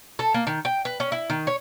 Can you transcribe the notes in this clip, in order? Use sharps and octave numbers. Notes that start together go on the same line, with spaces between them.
A4
A#3
D#3
G5
B4
C#4
E4
D#3
C#5